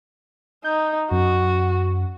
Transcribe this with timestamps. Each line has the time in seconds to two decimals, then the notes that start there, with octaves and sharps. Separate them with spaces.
0.64 D#4 G6
1.11 F#2 F#4